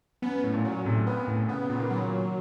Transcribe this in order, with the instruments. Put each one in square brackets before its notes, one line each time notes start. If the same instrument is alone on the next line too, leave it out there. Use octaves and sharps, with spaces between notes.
[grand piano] F#2 [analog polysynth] B3
[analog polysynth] A2
[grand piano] A#2
[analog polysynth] F#3
[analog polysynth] A2 [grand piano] C3
[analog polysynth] B3
A2
[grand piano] C#3 [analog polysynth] B3
[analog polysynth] A#2
[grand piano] D#3
[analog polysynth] F#3